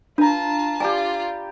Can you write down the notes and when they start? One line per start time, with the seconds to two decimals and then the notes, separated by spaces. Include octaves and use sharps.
0.18 D4 F4 B4 A5 A#5
0.80 F4 G4 D5 G#5 A#5